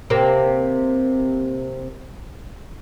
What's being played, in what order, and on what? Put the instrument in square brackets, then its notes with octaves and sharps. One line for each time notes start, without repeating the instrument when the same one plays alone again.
[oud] C3 A#3